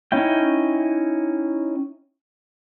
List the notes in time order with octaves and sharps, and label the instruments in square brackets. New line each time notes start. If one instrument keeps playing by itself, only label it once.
[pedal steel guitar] C#4 D#4 E4 G5